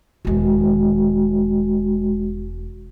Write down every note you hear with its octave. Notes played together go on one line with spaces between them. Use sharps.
E1 D#3 G#3 F#4